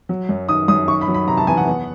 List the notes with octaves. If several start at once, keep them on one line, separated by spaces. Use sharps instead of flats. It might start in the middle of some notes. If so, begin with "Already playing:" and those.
F#3
F#2
D#3 D#6
F#2 D#6
D#3 C#6
B5
F#3
B5
C3 A#5
A5
E2 G#5
F#5
B3